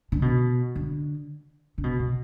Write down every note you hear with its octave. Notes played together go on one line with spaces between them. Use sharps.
D3
B2
D3
D3
B2
B2